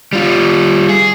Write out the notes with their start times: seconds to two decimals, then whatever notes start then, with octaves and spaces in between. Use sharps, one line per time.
0.13 G3 F4
0.89 G#4